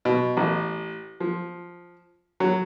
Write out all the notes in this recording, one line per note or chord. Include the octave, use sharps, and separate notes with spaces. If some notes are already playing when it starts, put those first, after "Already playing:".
B2
A1
F3
F#3